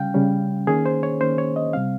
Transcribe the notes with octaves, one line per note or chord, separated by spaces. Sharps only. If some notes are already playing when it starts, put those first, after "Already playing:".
Already playing: C#3 G3 C#4 F5 G5
C#3 G3 C#4
D#3 A#3 C#4 G#4
C5
C#5
D#3 A#3 C#4 C5
C#5
D#5
C3 G3 C4 F5